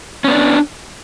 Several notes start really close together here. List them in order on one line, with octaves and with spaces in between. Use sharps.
C#4 B3 D5 D4